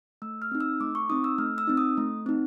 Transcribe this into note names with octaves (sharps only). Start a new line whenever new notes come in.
A3 E6
F6
C4 D#4
E6
A3 D6
C#6
C4 D#4 D#6
E6
A3 F6
E6
C4 D#4
D#6
A3
C4 D#4